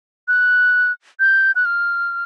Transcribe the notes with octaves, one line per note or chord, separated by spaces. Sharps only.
F#6
G6
F#6
F6